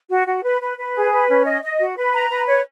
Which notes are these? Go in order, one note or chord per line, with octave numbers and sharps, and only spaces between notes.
F#4
F#4
B4
B4
B4
G#4
B4
C#4
D#5
D#5
F#4
B4
A#5
B4
C#5